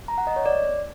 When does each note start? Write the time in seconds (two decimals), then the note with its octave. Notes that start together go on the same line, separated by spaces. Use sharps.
0.08 A#5
0.18 F#5
0.27 D#5
0.36 C#5
0.46 D5